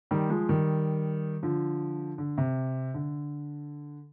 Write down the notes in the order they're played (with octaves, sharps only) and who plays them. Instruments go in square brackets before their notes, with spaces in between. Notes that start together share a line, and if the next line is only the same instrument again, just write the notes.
[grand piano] D#3 G3
F3 G#3
D#3 G3
D3 F3
D3
C3
D3